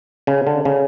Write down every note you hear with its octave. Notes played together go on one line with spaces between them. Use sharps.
C#3
D3
C#3